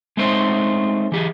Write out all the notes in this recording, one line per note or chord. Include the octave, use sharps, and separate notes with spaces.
G#3 A3 C4 C#4 D#4 C5
E3 G4 G#4